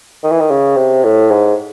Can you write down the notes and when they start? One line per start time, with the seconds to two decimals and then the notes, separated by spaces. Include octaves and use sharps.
0.23 D#3
0.31 E3
0.40 D#3
0.50 C#3
0.77 C3
1.04 A2
1.31 G#2